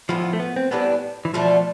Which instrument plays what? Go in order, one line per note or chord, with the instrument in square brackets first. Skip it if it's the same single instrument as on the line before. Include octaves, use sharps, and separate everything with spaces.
[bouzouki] A2 E3 B3 F4 [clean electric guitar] F3
[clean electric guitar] A3
B3
C4
[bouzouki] A2 E3 G3 D4 [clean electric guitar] B3
[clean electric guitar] E3
[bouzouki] B2 A3 D4 [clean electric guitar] F3